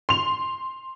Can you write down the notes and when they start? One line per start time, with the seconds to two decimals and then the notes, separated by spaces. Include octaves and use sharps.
0.09 C6 F7